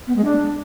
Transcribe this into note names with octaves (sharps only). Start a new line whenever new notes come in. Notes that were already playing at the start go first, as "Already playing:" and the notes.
B3
G#3
D4